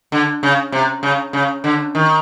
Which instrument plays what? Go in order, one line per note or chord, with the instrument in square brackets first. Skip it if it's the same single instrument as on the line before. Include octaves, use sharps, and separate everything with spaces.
[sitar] D3
C#3
C3
C#3
C#3
D3
D#3